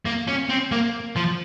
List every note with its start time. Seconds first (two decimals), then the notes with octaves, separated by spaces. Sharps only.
0.05 A#3
0.27 C#4
0.49 C4
0.72 A#3
1.16 F3